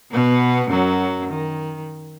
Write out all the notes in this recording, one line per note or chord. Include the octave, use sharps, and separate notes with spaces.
B2 B3
F#2 F#3
D#3